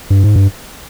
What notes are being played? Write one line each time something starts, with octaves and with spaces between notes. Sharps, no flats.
G2
G#2
G2